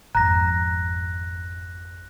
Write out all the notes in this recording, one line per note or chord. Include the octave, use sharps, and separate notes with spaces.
G#1 F2 A#5 F#6 A#6